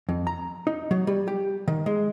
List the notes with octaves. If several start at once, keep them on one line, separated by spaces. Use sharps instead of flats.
F2
A#5
D#4
F#3
G3
G4
D#3
G#3